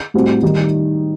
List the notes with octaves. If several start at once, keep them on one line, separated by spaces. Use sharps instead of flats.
A2 G3 C4 F#4
D#3 G3 D#4